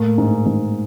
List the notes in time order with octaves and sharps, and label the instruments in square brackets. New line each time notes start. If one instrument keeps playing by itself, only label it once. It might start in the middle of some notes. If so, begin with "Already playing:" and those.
Already playing: [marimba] A2 A3 [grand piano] A#3
[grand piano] G#2
G#2